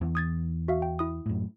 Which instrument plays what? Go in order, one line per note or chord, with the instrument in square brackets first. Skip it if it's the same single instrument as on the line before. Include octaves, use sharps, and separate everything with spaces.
[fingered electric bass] E2 E3
[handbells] D#6 G#6 A6
F#4 E5 F5
G5
E4 D#6
[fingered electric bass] F#2 A2